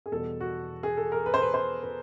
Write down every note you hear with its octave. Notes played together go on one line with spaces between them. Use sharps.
G#4
E2 B2 G3 A4
F#4
G#4
A4
A#4
B4
C5
B4
C5
B4